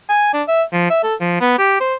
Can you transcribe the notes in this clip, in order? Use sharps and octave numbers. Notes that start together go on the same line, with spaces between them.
G#5
D4
E5
F3
E5
A4
F3
B3
G4
C5